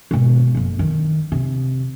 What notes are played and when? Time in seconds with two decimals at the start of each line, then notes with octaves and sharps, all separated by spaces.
0.11 G#1 B2
0.55 F#1 F2
0.79 D#3
1.32 C3